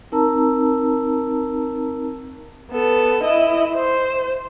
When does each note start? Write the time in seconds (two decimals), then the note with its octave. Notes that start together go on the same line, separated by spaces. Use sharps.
0.12 C4 D#4 A#4 A5 A#5 E6
2.71 B3 A4
3.23 E4 D#5
3.74 C5